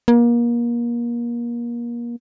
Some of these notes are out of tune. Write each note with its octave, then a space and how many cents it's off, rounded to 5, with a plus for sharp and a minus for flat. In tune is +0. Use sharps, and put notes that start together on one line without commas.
A#3 +30